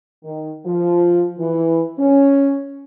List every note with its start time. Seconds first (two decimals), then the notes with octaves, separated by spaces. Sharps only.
0.24 D#3
0.66 F3
1.39 E3
1.98 C#4